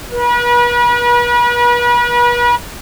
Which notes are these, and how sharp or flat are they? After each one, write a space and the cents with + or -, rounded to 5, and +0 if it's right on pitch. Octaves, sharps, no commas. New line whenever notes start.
B4 -40